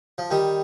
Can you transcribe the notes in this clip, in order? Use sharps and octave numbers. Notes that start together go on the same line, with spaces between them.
F3
D#3 G3